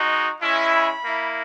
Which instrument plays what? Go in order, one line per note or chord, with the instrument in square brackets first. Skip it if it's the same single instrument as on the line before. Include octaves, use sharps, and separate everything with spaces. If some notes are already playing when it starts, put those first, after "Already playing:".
Already playing: [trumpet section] G#3 D#4 F#4
G#3 C#4 E4
B5
A#3 E4